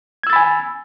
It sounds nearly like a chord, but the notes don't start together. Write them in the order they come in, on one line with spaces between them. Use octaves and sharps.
G#6 E6 A6 B5 G#5